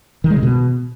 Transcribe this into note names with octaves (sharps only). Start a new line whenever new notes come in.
D#3
G#3
C#3
B2